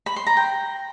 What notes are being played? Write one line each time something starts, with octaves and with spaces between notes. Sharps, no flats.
B5
C6
A#5
G5